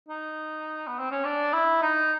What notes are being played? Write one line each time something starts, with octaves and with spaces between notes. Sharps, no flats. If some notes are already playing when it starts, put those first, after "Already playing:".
D#4
B3
C4
C#4
D4
E4
D#4